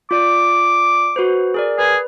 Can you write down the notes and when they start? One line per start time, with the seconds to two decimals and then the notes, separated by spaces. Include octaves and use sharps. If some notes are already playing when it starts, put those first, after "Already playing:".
0.11 F4 D5 D6
1.16 F#4 B4 C5
1.54 G#4 A#4 D5
1.79 G#4 B4